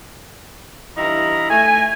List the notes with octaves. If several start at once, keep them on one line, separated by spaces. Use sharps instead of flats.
G2 E3 D#4 E4 F5 A#5
A3 G#5